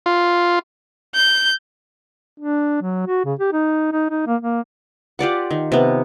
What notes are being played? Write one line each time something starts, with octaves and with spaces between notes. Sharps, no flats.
F4
G6
D4
F#3
F#4
C#3
G4
D#4
D#4
D#4
A#3
A#3
F4 G4 D5 F#5
D#3
C3 B3